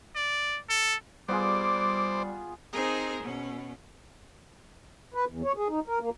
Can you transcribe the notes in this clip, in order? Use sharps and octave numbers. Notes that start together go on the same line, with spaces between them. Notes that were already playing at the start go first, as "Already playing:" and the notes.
D5
A4
G3 B3 F4 G#4 C5 D5 D6
C4 D#4 G#4 A#4 C5
B2 C#4
B4
E2
C#5
G#4
D#4
A#4
A#3